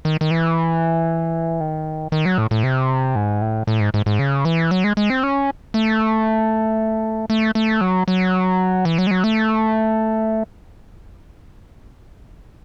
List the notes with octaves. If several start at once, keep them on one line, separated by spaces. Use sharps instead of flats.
D#3
D#3
E3
D#3
D#3
F#3
A2
A2
C3
G#2
A2
A2
G#2
G#2
G#2
C#3
E3
F#3
G#3
G#3
C4
C#4
A3
A3
A3
F#3
F#3
E3
F#3
G#3
F#3
A3